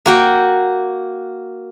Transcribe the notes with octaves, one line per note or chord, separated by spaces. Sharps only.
A#3 F#4 G5